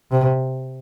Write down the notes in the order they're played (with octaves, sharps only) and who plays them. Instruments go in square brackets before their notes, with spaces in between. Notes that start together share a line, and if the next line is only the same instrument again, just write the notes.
[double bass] C3